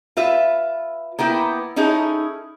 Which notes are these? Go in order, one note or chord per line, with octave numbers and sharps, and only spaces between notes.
F4 B4 E5
A#3 B3 E4 G5
C#4 D#4 E4 G#4 A4